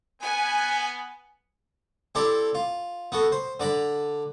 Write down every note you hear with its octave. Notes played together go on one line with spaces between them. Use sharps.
B3 G#5
C4 E4 G4 A4 D5
F4
B3 F#4 A4
C5
D3 D5 A#5 B5